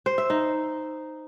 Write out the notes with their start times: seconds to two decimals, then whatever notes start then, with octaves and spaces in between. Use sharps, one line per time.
0.06 C5
0.18 E5
0.30 D#4